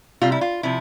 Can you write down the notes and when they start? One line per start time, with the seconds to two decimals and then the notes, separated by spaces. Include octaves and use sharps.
0.22 C3 G3 F4
0.32 E4
0.41 F4
0.63 C3 F3 E4